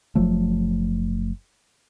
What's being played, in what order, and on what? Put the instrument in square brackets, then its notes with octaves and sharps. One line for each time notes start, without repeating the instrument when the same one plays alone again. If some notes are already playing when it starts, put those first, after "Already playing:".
[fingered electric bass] F#1 F3 F#3 A3